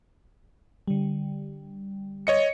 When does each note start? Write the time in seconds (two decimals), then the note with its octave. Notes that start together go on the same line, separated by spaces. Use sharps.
0.88 D3 G3
2.27 C#5 D#5 C#7